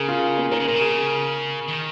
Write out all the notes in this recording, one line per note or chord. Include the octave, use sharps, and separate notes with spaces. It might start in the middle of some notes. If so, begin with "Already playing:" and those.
Already playing: C#3 G#4 A#4
F4
A#3
D#3 A#4
C#3
A#2
C#3
G#4
D#3